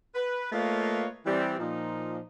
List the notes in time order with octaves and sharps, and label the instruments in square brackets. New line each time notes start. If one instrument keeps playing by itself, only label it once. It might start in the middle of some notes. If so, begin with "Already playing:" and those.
[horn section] B4
A3 A#3 F4 B4 C#5 D#5
E3 G3 C4
A#2 F3 D#4